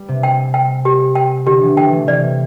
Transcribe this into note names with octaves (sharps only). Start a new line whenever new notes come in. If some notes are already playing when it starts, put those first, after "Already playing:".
Already playing: G3
C3
G5
G5
G4
G5
D3 G4
C3 E3
E3 A3 G5
E3 A3
C3 E3 D5